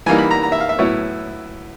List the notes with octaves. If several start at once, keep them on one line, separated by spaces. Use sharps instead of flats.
E3 G3 A#3 D#4 G#5
B5
A#5
A#5
E5
F5
E5
A2 F#3 B3 E4 C#5